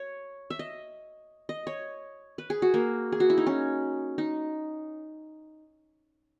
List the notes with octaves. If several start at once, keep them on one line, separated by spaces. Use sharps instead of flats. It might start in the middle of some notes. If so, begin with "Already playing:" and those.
Already playing: C#5
E5
D#5
D#5
C#5
B4
G#4
F#4
A#3
G#4
F#4
E4
D#4
C#4
D#4